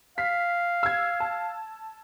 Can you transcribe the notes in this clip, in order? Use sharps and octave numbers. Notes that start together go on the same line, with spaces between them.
F5 B6
E6 G#6
A5